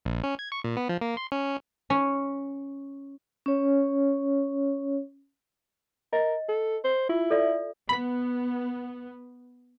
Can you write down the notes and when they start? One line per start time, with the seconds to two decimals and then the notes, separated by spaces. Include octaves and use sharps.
0.05 A#1
0.23 C#4
0.39 G#6
0.52 C#6
0.64 A#2
0.77 B3
0.89 F3
1.01 A#3
1.17 C6
1.32 C#4
1.90 C#4
3.46 C#4 C#5
6.13 A#4 D#5
6.49 A4
6.84 C5
7.09 E4 F4
7.30 A4 D5 E5
7.89 B3 B5 B6